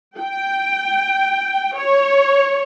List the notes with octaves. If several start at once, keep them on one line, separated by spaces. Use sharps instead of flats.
G5
C#5